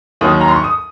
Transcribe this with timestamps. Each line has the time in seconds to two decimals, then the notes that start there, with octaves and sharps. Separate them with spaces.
0.21 D#2 D#3 F#3 D#6
0.41 A#5
0.48 C6
0.56 C#6
0.64 D#6